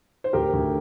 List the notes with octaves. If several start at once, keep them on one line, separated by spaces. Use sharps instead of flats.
C5
D2 G4 A#4
D2